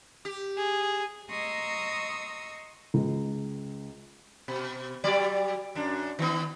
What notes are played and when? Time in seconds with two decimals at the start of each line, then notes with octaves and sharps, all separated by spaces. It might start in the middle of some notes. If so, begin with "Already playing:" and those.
0.25 G4
0.57 G#4
1.30 D#5 A#5 C6 C#6 D#6 E6
2.94 C#2
4.48 B2
5.04 F#3 G3 D5
5.75 F#2 D4
6.19 D#3 B3